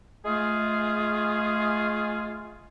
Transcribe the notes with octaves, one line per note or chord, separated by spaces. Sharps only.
G#3 A3 F4 G#4